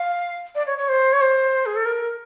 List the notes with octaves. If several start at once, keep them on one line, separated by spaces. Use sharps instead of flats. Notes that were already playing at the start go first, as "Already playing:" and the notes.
Already playing: F5
D5
C#5
C#5
C5
C#5
C5
G#4
A4
A#4